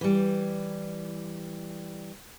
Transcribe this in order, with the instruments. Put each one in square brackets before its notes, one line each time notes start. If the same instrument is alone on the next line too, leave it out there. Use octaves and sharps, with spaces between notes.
[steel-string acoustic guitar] E3 G3